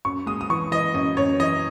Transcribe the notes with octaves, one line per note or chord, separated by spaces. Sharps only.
F#2 C#6
G#3 D#6
D#6
E3 C#6
E3 D#5
F#2 D#5
F#2 C#5
E3 D#5